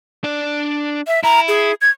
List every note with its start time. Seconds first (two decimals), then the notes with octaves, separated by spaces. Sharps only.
0.24 D4 D5
1.07 E5
1.23 E4 A#5
1.48 G#4
1.81 G#6